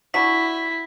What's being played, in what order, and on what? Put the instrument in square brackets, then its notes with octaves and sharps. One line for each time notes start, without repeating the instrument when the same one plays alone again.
[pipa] D4 F#4 [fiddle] E4 [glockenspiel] B6